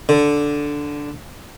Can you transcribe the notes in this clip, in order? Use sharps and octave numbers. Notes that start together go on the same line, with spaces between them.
D3